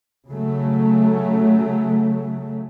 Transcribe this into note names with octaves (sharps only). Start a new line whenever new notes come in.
C#3 F#3 A3